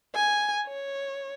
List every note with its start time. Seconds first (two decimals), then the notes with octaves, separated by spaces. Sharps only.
0.15 G#5
0.67 C#5